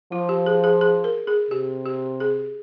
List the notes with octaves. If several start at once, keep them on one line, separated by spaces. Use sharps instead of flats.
F3 F4
G4
G#4
G#4
G#4
A#4
G#4
C3 G4
G4
G#4